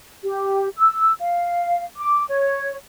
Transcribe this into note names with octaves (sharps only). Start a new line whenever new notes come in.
G4
E6
F5
D6
C#5